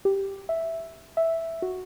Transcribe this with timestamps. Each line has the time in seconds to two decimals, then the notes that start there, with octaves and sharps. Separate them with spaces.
0.05 G4
0.49 E5
1.17 E5
1.62 F#4